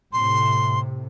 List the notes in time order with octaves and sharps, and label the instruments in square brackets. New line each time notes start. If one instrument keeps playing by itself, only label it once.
[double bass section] A2 C3 [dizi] C6